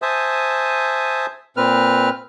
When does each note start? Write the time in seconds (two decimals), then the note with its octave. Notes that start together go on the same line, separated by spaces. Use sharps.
0.02 C5 E5 G#5 A5 D#6
1.57 A#2 C4 B4 F6